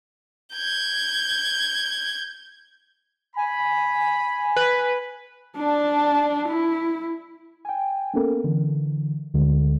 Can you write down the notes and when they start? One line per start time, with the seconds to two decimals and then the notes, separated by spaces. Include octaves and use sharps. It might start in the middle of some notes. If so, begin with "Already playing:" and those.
0.54 G6 G#6
3.36 G#5 B5
4.56 B4
5.57 D4 A5
6.49 E4
7.65 G5 G#5
8.14 A#3 B3 C#4 A4 A#4
8.44 D3 E3
9.34 D2 D3 G#3